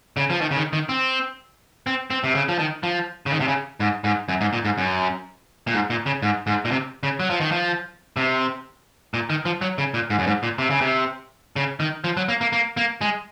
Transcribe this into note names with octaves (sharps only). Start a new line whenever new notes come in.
C#3
F3
D#3
C#3
D#3
D#3
C4
C4
C4
C3
C#3
F3
D#3
F3
C#3
D#3
C3
C#3
G#2
G#2
F#2
G#2
A#2
G#2
F#2
A#2
G#2
A#2
C#3
G#2
G#2
A#2
C3
C#3
F#3
F3
D#3
F3
C3
A#2
D#3
F3
F#3
C#3
A#2
G#2
F#2
G#2
A#2
C3
C#3
C3
C#3
D#3
F3
F#3
A#3
A#3
A#3
A#3
G#3